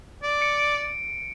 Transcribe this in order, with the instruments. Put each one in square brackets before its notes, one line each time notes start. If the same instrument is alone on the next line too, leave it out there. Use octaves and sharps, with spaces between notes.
[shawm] D5
[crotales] C#7 D7